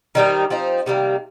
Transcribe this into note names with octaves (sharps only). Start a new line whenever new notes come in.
D#3 G3 C4 D#4
F3 C4 D#4
C3 D#3 G3 A#3